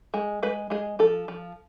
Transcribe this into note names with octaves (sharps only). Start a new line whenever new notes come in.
G#3
G#3 B4
G#3 G#4
F3 A4
F3